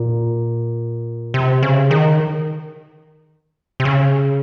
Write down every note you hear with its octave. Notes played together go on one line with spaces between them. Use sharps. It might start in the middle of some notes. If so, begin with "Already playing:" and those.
Already playing: A#2
C3
C#3
D#3
C3
C#3